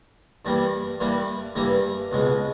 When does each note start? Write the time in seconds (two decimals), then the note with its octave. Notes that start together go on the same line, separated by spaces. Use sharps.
0.45 G2 E3 G3 A#3
1.00 G2 E3 G3 A#3
1.55 G2 E3 G3 A#3
2.12 C#2 B2 G#3